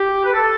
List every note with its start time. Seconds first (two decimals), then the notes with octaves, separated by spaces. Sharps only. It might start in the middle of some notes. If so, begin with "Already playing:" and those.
Already playing: G4
0.25 B4
0.33 A4